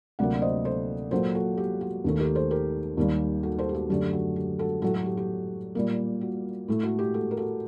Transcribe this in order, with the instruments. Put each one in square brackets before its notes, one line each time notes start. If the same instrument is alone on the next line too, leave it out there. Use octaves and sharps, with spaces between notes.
[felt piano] D2 C3 F#3 A#3 D5 F#5
C5 D#5
A4 C5
A#2 F#3 A#3 A4 C5
F#4 A4
G4
F#4
D#2 D#3 A3
G4 A#4
A4 C5
G4 A#4
D#2 D#3 G3 A#3
F#4 A4
A4 C5
G4
F#4 A4
F#2 D3 A3 G4
F#4
G4
F#4 A4
A2 F#3 A3 F#4 A4
F#4 A4
G4
G4
A#2 G3 A#3
F#4
A2 A3
F#4 A4
G4
F#4 A4
A#4
F#4 A4